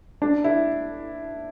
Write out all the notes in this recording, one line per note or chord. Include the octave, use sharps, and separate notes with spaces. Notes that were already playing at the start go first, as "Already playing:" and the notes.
D4
E4